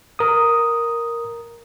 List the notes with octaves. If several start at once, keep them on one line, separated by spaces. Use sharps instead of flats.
A#4 D#6